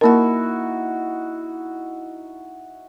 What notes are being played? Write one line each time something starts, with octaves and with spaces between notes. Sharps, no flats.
A#3 D#4 E4 F#4 A#4